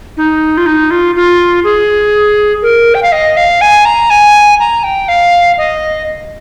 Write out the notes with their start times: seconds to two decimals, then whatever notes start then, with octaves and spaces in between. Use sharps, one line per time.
0.17 D#4
0.57 F4
0.66 D#4
0.91 F4
1.16 F4
1.64 G#4
2.63 A#4
2.95 G5
3.03 F5
3.12 D#5
3.37 F5
3.61 G#5
3.85 A#5
4.10 G#5
4.59 A#5
4.84 G5
5.08 F5
5.58 D#5